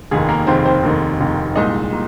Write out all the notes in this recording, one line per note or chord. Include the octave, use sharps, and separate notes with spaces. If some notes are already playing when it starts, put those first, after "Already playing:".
F1 D#2 D#3 G#4
A#3 A#4
F1 D#2 D#3 C4 C5
C4 C5
F1 D#2 D#3
F1 D#2 D#3
C2 A#2 G#3 D#4 D#5
A#2